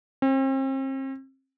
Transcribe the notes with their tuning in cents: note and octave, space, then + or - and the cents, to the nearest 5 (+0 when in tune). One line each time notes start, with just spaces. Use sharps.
C4 +40